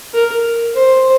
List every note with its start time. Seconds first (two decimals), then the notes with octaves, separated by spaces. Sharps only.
0.14 A#4
0.76 C5